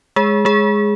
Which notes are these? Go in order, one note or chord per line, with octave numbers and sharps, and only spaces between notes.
G#3 G#4
G#3 G#4